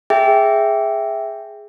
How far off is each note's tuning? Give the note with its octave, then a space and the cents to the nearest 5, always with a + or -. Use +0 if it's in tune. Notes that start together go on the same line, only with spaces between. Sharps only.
G#4 +0 E5 +0 G5 +0